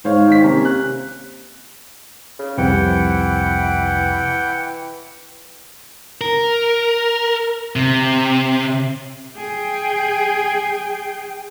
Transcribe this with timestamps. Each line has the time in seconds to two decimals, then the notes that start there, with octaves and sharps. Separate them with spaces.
0.05 G#2 C5 C#5 F5
0.28 D#3 B6
0.44 C3 A#3 C#4
0.65 F#6
2.39 C#3
2.58 C2 F2 C3 E3 F#5 G5
6.21 A#4
7.76 C3
9.37 G#4 G5